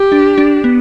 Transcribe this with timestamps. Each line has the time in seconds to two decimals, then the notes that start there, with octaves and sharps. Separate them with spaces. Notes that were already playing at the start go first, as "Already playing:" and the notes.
Already playing: G4
0.12 D4
0.38 D4
0.64 B3